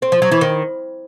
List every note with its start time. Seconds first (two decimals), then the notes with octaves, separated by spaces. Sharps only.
0.02 C4
0.12 F3
0.22 F#3
0.32 E3
0.41 D#3